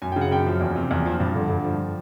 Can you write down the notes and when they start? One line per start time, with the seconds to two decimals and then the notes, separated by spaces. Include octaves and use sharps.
0.02 F#2 G#5
0.12 C#3 G5
0.21 F#5
0.31 F#2 G5
0.46 F3
0.61 E2
0.76 C3
0.91 E2
1.06 F3
1.20 G2
1.35 D3
1.50 G2
1.64 F3